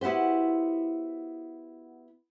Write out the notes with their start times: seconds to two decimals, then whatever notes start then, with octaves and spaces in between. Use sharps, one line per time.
0.01 B3 E4 F#4 G4 C5